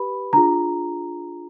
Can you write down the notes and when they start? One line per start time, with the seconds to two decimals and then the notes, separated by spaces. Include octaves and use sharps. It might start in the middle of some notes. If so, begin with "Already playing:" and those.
Already playing: G4 B4 B5
0.33 D4 F4 G#4 A#5